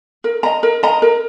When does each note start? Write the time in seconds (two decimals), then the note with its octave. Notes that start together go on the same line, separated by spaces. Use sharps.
0.24 A#4
0.43 D#5 A#5
0.63 A#4
0.83 D#5 A#5
1.02 A#4